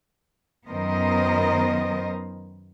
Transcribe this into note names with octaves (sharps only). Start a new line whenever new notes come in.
F#2 D#3 B3 A#4 C5 D#5